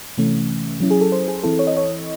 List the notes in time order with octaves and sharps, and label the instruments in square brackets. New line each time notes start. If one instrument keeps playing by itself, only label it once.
[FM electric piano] C3 E3 A3 C#4
F#3 C#4 E4
G#4
A4
C5
G#4
E3 C4 E4 A4
C#5
D#5
C#5